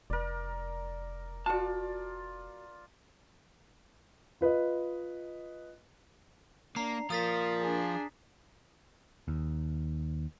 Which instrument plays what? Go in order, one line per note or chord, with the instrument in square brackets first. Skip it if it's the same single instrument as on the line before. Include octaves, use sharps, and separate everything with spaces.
[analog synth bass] F1 [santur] A#4 D5
[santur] F4 D5 [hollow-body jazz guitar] F#4 A5
[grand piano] F4 B4 D#5
[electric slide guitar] A#3 [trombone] D4 [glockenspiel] A#5 C7
[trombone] A#2 [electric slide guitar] F3 F4 [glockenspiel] D#6 A6 B6
[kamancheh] D4 G#4
[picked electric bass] D#2